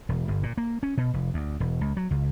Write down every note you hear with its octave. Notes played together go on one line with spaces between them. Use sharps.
E1
G1
A#2
A#3
C#4
B2
F1
D2
E1
C#2
F#3
C#2